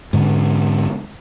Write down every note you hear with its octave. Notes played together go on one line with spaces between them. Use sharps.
G#2 D3